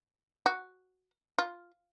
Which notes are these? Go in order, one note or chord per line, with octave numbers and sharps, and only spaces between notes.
F#4
F4